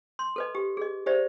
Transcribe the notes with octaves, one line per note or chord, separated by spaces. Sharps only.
C6
A4 B4 D#5
G4
G#4 D#5
G4 C5 D5 E5